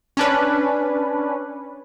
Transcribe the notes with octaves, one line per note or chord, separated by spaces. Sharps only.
C#4 D4 B4